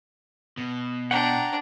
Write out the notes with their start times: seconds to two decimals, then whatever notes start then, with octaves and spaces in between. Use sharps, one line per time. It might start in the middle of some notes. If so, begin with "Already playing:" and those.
0.57 B2
1.11 D4 F#5 G5 A#5